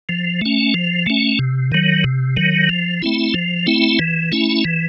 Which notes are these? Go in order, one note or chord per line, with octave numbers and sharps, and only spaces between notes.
F3
A3 C#4
F3
A3 C#4
C3
D#3 F#3
C3
D#3 F#3
F3
A3 C4 E4
F3
A3 C4 E4
E3
A3 C#4 E4
E3